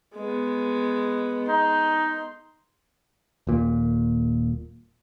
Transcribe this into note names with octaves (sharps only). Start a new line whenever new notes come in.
G#3 B3
D#4 C6
D#1 A#2